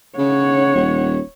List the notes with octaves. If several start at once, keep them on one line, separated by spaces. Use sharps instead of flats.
C#3 C#5 F#5
D#1